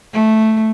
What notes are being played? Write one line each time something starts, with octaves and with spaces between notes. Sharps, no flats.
A3